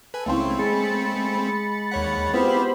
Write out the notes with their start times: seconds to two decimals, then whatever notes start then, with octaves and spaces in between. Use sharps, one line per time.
0.14 A4 B4 G#5
0.26 C#2 A3 C4 E4 F5 C6 C#6
0.59 G#3 B5 A6 C#7
1.92 D#2 C#5 F#5
2.34 B3 C4 E4 F4 G4 C5 B5